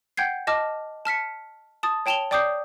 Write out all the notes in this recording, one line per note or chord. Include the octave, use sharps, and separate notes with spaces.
F#5 G5 G6 G#6 C7
D#5 A5 D6 F6
A5 F6 B6 C#7
A5 D#6 A6
C#5 G5 A5 E7 F7 G7
D5 G5 D6 D#6 G6 C7